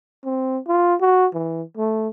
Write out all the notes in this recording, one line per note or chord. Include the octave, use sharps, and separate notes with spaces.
C4
F4
F#4
E3
A3